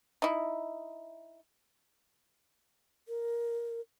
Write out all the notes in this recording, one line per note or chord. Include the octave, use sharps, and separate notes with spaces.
D#4 E4
A#4